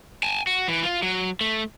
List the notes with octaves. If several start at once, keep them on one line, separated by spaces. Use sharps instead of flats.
G#5 A5
F#4
E3
F4
F#3
A3